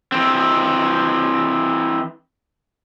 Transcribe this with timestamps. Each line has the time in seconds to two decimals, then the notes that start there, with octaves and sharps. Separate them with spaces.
0.12 E3 C4